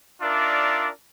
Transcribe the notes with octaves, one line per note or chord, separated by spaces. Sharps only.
D4 D#4 F4 A#4 D5 E5